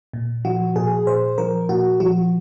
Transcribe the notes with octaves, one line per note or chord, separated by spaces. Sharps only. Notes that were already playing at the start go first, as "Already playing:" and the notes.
A#2
F3 F#4
A#2 G#4
A#2 C5
F3 A#4
A#2 F#4
F3 F#4